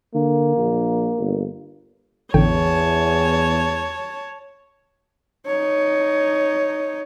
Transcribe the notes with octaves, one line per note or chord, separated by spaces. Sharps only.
D3 A#3
A#1
G1
A1 E2 D3 C#5 G5 A5
D#4 C#5